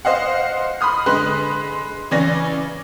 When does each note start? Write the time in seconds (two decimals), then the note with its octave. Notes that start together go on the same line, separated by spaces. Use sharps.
0.05 C5 D#5 F5 F#5
0.81 B5 C6 D#6 F6
1.06 D3 G#3 B4 C6 F#6
2.11 C#3 E3 C#4 D5 A#6